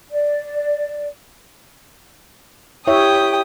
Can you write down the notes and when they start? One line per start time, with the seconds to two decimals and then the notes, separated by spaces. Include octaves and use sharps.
0.11 D5
2.87 E4 G4 C#5 E5 G5 D#6